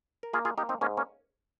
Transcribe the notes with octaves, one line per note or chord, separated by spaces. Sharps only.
A#4
A#3 F4 G#4
F4 G#4
A#3 D#4 G4
C4 D#4
G#2 A#3 C#4
A#3 C#4